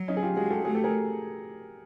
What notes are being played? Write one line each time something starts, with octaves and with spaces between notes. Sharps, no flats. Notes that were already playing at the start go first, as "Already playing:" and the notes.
Already playing: F#3
C#4 D#4
G#4
F4 G4
G#3 F#4 G#4
G4 A4
A3 F#4 G#4
G4 A4
G#4 A#4